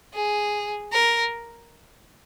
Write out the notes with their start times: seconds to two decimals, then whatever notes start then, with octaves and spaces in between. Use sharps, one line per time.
0.14 G#4
0.92 A#4